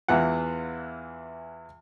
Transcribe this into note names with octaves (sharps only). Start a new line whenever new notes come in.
E2 E3 F4 F#5